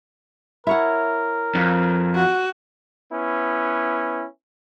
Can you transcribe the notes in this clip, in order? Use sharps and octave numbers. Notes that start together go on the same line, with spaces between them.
E4 A#4 C#5 F#5
F2
F#4
B3 C#4 E4